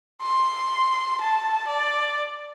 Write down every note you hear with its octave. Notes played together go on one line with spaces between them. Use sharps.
C6
A5
D5